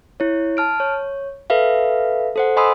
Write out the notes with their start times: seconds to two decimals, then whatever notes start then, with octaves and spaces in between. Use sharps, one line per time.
0.20 E4 C#5
0.57 A5 F6 D7
0.80 C#5
1.50 A4 B4 E5 F5
2.36 A4 C5 F#5
2.57 D#5 G#5 B5 C6 D#6 E6